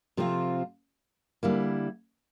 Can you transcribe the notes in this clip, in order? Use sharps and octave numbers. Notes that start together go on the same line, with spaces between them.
C3 F3 A3 C4 F4
D3 G3 A#3 E4